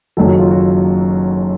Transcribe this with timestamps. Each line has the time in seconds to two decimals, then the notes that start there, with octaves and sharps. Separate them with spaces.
0.17 F#1 F#2 D#3 F#3 A4
0.28 F#4
0.39 F4
0.51 F#4